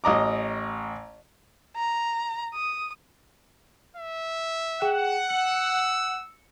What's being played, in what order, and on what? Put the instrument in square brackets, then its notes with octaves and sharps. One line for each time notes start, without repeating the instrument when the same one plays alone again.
[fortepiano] A1 D#5 A#5 D6
[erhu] A#5
D#6
[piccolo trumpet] E5
[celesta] G#4 G5 E7 [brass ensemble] F#5
[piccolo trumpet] E6 [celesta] C#7